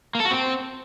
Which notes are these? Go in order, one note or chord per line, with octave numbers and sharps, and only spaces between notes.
A#3
A4
F#4
C4